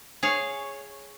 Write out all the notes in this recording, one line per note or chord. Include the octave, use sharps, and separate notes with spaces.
G#4 C#5 F5